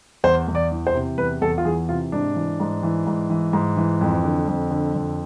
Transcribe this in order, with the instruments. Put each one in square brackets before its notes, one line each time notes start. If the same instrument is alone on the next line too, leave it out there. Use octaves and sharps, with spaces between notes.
[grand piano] E2 C5
E2
D5
E3
C5
C3
E2 B4
E2 A4
F4
E3 G#4
C3 F4
G#2 D4
E3
G#2
E3
G#2
E3
G#2
E3
F2
D3
F2
D3
F2